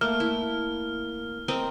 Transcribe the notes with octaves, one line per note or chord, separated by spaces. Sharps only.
A3 A#3 F6
E4
C4 A#4 D#5